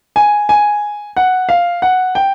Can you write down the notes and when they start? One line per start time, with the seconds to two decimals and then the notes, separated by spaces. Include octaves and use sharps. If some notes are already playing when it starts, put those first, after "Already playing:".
0.16 G#5
0.49 G#5
1.17 F#5
1.49 F5
1.82 F#5
2.15 G5